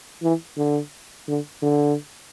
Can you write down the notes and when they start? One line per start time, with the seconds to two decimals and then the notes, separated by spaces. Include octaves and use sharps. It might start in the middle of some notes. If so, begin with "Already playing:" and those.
0.23 E3
0.57 D3
1.28 D3
1.62 D3